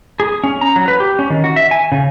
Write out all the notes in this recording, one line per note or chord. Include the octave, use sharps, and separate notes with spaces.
G#4
C#4
A#5
F#3
B4
G4
C#4
D#3
F#4
E5
G#5
C#3